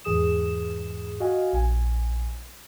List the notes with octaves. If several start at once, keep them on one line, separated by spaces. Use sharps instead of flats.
E2 G#2 E3 G#4 D#6 E7
F#4 D#5 F5 G#5
A#1 G#5